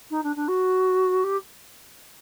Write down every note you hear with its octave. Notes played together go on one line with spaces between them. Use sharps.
D#4
D4
D4
F#4
G4